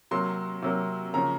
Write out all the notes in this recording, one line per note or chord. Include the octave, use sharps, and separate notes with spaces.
C3 F#3 A#3 C6
C3 F#3 A#3
C#3 F3 A#3 A#5